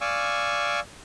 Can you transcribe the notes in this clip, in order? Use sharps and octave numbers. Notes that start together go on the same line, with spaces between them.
D5 F5 G#5 C#6 D6 E6